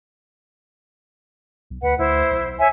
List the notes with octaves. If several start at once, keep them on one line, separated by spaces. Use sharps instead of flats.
B1
D2 B4 F#5
D2 E4 C5
B1
C#5 E5 G#5